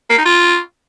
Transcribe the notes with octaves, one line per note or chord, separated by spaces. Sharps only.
A#3
D#4
F4